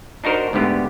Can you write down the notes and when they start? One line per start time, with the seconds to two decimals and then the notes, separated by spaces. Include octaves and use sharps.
0.24 D4 D#4 F#4 A#4 C5
0.53 D2 G#2 D3 B3 G4